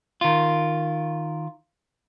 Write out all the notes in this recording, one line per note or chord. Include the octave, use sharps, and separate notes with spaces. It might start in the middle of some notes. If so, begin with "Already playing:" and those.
D#3 F4